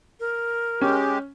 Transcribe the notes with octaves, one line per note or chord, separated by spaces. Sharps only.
A#4
G#3 C#4 G4